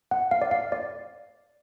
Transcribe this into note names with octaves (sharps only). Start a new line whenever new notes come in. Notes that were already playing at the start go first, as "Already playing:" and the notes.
F#5
F5
D5
F5
D5